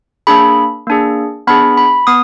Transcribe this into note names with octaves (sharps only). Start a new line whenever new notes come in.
A#3 D4 G#4 B5
A#3 D4 G#4
B3 D4 G#4 B5
B5
B3 D#6